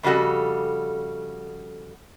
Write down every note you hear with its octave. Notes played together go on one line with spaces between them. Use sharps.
F2 C#3 G3 F#4 A4